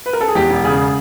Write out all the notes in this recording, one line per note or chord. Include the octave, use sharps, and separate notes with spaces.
B4
A#4
A4
G#4
E2 G4
E1
C#3 G#4